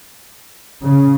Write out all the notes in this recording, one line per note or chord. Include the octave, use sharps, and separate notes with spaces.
C#3